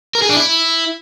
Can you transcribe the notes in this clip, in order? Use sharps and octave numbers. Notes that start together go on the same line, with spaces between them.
A#4
G#4
D4
E4